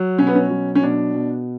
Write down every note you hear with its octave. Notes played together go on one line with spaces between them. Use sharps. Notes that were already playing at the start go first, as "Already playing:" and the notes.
Already playing: F#3
B2 C#4
B3
C#4
F#3
C#4
B2 D4
B2